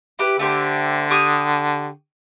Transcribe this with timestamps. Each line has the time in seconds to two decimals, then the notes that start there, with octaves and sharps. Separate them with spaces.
0.19 E4 G4 B4
0.39 D3 A3 G4 C5
1.10 G4 C#6 D#6